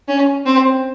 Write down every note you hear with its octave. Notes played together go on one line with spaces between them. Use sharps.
C#4
C4